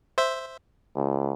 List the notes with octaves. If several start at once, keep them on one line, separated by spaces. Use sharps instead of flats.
C5 E5
C#2